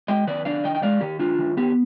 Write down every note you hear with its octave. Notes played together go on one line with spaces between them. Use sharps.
G#3 D#5 G5
D#3 B4 D5
D4 D5 F5
D#3 D#5 G5
G5
G#3 D5 F5
D#3 G4
D4 F4
D#3
B3 G4